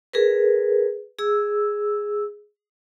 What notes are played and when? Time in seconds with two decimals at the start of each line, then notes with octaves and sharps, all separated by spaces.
0.13 G#4 A#4 B4
1.19 G#4 E6